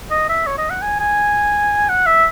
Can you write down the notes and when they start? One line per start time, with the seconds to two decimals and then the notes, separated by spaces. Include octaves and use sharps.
0.11 D#5
0.29 E5
0.47 C#5
0.58 D#5
0.70 F#5
0.82 G#5
1.00 G#5
1.89 F#5
2.07 E5